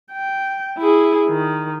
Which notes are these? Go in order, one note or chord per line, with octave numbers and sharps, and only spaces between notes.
G5
E4 G#4
D#3